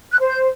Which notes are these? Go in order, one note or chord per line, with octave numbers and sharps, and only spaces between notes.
F#6
C5
G6